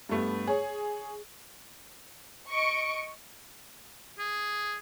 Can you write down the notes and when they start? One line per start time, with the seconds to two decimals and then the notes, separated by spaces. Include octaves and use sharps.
0.09 G2 G3 A3 B3
0.47 G#4 C#5
2.50 D#5 C#6 C#7 D7
4.19 G#4